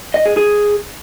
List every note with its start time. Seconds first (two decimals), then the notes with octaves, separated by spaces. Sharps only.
0.14 D#5
0.26 G#4
0.37 G#4